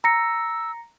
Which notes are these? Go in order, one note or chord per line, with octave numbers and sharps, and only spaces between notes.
A#5 E6 A#6 C#7